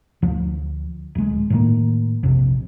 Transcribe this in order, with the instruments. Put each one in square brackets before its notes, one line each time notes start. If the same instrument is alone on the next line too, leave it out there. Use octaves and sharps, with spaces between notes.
[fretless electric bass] D2 F3
D1 G#3
A2 D#3 A#3
A#1 F2 C3